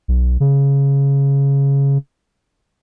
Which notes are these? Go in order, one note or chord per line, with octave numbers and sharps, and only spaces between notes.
B1
C#3